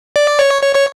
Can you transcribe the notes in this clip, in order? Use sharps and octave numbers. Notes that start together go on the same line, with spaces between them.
D5
C#5
C#5
C#5